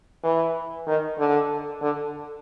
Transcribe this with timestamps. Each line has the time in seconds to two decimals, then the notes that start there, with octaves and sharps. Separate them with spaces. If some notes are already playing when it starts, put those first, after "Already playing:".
0.24 E3
0.87 D#3
1.19 D3
1.82 D3